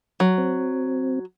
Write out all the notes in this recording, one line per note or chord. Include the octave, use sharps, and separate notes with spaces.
F#3
C4